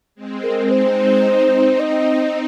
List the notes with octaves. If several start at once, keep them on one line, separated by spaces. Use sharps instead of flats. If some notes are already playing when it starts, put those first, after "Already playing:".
G#3 C4
A#4
C4 D#4 C5
C4 D#4
D#5